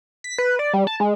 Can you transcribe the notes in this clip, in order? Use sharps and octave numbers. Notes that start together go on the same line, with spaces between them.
B6
B4
D5
G3
A5
G#3